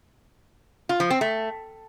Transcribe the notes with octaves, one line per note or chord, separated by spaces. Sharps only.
F4
F3
C4
A3